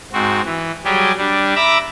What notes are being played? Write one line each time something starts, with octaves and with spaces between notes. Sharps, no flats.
G#2 C4 F#4
E3
F#3 G3 G4 G#4
G3 D4
E5 A#5 B5 D6 E6